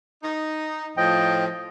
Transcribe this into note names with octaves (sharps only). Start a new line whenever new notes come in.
D#4
A2 F3 D#5 G5